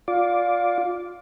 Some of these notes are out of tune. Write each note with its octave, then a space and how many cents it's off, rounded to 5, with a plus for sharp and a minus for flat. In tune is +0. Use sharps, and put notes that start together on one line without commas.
F4 +15 D5 -10